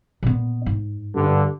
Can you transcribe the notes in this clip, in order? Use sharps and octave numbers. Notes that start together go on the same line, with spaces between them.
A#2 B3
G#2
G2 D3